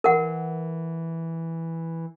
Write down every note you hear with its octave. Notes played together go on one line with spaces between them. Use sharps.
E3 A#4 F#5